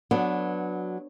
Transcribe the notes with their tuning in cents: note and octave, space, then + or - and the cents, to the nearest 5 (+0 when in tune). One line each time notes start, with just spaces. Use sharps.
F#3 -15 B3 +0 D4 +0